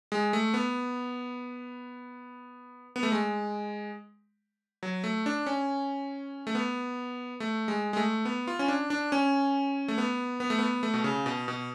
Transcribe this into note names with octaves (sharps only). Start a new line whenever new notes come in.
G#3
A3
B3
B3
A3
G#3
F#3
A3
D4
C#4
A3
B3
A3
G#3
G#3
A3
B3
F4
C#4
D4
D4
C#4
A3
B3
B3
A3
B3
A3
B2
C#3
B2
B2